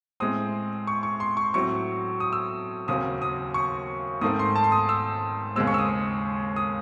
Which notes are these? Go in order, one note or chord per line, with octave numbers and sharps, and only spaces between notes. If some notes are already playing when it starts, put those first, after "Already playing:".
A2 G#3 C4 D#6
C#6
C#6
C6
C#6
A2 F#3 C4 C#6
D#6
E6
D#2 C#3 F#3 C4 D#6
D#6
C#6
G#2 D#3 A3 C4 D#6
C6
A5
C6
D#6
E6
D#2 C#3 G#3 C4 E6
C#6
E6
D#6
D#6